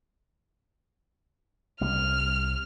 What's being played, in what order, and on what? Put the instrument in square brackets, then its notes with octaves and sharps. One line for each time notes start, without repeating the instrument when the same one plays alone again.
[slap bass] C2 G3 [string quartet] F6